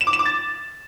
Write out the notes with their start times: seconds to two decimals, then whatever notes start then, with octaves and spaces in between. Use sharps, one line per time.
0.01 E7
0.07 D6
0.13 E7
0.19 D6
0.25 A6